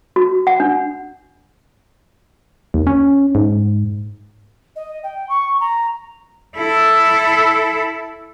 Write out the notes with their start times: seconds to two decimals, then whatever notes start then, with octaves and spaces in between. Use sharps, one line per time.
0.16 F#4
0.47 F#5
0.60 D4
2.74 D#2
2.87 C#4
3.35 G#2
4.76 D#5
5.04 G5
5.29 C#6
5.60 A#5
6.56 E4 A4